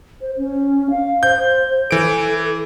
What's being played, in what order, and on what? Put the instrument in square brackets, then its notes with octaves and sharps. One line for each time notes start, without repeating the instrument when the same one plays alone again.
[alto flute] C5
C#4
F5
[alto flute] C5 [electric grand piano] G6
[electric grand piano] E3 D7 [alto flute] A4